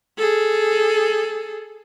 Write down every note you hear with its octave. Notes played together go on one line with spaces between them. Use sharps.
G#4 A4